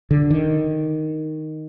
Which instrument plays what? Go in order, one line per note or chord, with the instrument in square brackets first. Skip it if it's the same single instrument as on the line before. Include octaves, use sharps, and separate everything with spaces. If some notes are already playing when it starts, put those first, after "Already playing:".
[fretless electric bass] D3
D#3